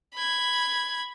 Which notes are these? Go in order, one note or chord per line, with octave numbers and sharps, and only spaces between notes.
B5 G#6